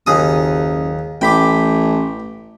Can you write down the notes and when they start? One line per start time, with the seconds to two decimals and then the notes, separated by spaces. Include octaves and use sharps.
0.07 F#1 D#2 G#4 D#6
1.21 A1 G5 B5 D6